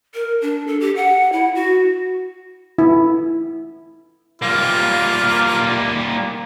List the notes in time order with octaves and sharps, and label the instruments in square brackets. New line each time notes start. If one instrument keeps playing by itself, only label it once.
[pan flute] A#4
D4
A4
G4
F#5
E4
F#4
[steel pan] E4
[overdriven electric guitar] G3 A#3 [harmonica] F4